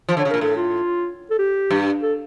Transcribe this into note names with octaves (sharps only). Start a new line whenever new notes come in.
F3
D3
C#5
C#3
A#4
A#2
A2 A4
F4
A4
G4
G2
A4